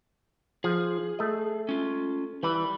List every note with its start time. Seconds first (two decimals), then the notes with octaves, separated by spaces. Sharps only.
0.64 F3 G#4
1.19 A3 D#5
1.69 C#4 F4
2.43 E3 G3 B5